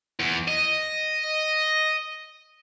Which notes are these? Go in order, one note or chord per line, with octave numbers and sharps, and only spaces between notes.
E2
D#5